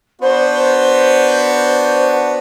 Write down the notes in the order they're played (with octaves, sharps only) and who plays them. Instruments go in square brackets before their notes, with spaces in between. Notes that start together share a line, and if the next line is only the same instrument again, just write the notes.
[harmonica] B3 D4 F#4 [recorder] C5